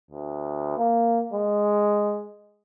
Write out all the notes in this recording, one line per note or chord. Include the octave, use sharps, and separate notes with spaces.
D2
A#3
G#3